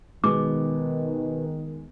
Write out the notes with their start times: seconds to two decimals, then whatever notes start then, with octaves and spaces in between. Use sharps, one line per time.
0.24 B2 D#3 G#3 D6